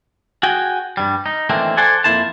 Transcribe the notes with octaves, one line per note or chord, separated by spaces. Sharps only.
F#4 G#4 G5
G2 G3
D#4
D#3 E3 A3 A#3 C4 D4
A4 C5 D5 F#5 G#5
F2 G#3 A#3 E4 C5 A5